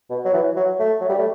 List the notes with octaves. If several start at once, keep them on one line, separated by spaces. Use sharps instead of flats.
B2
F#3
E3
F#3
A3
F#3
G3
A3